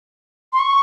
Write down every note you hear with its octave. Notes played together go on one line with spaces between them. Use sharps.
C6
C#6